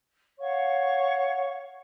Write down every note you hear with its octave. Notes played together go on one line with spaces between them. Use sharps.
C#5 F5 F#5 C#6